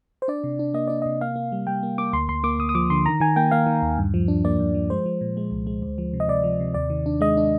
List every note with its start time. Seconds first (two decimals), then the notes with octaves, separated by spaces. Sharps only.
0.22 C5
0.28 D4 D5
0.44 C3
0.59 D4
0.74 A#3 D#5
0.88 D4 D5
1.02 C3 D#5
1.21 A#3 F5
1.36 A#3
1.52 G3
1.67 G3 G5
1.83 A#3
1.98 A#3 D6
2.13 D2 C6
2.29 D2 C6
2.44 A#3 D6
2.59 D2 D#6
2.69 D#6
2.75 F3 D6
2.90 D3 C6
3.06 D#3 A#5
3.20 D#3 G#5
3.36 A#3 G5
3.51 A#3 F5
3.67 D#3
3.82 D#2
3.98 G2
4.14 F3
4.28 D4
4.45 A#3 D5
4.60 G2
4.75 F3
4.90 G#3 C5
5.06 F3
5.21 A#2
5.37 G#3
5.51 C2
5.67 G#3
5.82 D2
5.98 F3
6.13 C3
6.20 D#5
6.28 C3 D5
6.44 F3
6.60 C3
6.74 D#2 D5
6.90 D#3
7.06 D4
7.21 G#3 D#5
7.37 D4